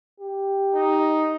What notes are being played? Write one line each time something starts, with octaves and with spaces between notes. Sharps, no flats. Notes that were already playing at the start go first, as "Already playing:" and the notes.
G4
D#4